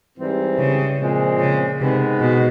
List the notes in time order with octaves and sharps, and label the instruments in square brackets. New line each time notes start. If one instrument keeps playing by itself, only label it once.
[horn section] G#2 E3 G3 C4
[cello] C#3
[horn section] A#2 F3 G#3 C4
[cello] C#3
[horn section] G#2 D#3 G#3 B3 [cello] C3
[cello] B2